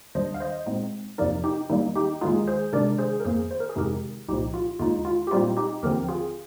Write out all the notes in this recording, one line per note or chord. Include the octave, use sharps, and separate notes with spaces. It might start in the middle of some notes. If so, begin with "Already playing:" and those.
D#2 D#3 G3 D4 C5 D#5
F5
C5 D#5
A#2 G#3 C4 D#4
F2 C3 F3 A#3 D#4 A#4 D5
D#4 G4
D#2 D#3 G3 A#3 D#4
D#4 G4
D#2 D#3 G#3 D#4 F4 G#4
G#4 C5
C3 D#3 G#3 D4 A#4 D5
G#4 C5
A#4
F2 D#3 A#3 G#4 C5
C5
A#4
G#4
F2 C3 D#3 G#3 D#4 G4 A#4
C2 A#2 F3 D#4 G4
F4
D#2 D3 G#3 D#4 F4
F4
G4
A#2 G3 C4 D#4 F4
D#4 G4
D#2 D3 F3 C4 G4 A#4
F4 G#4